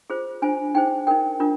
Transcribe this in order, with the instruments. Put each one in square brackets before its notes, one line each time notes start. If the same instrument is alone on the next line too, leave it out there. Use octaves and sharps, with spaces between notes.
[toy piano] F4 G#4 C5
D4 F4 C5 G#5
D#4 G#4 C5 G5
D#4 A#4 G5
D4 F4 A#4